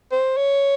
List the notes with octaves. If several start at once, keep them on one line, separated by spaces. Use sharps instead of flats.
C5
C#5